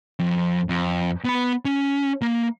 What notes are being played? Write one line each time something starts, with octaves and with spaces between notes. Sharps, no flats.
F2
F2
B3 B5
C#4
A#3